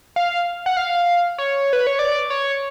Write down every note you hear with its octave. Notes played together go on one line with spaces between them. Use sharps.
F5
F#5
F5
C#5
B4
C#5
D5
C#5